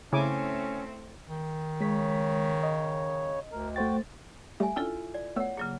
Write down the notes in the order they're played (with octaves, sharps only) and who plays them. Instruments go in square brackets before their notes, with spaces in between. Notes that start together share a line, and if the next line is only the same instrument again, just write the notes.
[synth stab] C#3 [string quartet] A3 C4 [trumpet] C#4 [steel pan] E4 G#5 D6
[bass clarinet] D#3
[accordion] C#3 C#5 [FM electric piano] G#3 B6
[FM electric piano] D#5
[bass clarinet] D2 [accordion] A#4
[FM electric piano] A3 C5 A6 [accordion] F#4 G5
[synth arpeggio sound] G3 A3 G4 [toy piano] E5 G#5
[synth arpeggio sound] C#4 D4 G5 [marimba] E4 F4 A4
[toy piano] D5
[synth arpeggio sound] A3 B3 E6 [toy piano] C#5 F#5
[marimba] C#3 F#3 A#3 [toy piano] G#4